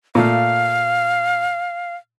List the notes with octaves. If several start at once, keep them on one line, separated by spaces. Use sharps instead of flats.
A#2 A3 F5